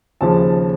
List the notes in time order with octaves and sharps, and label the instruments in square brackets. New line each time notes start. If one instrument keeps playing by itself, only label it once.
[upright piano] D#2 C#3 F3 A5